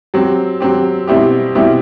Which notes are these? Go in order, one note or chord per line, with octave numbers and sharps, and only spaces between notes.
F#3 C4 G4
F#3 C4 G4
B2 G3 C4 E4 G4
B2 G3 C4 E4 G4